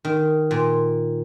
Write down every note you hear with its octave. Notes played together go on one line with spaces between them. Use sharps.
D#3
A#2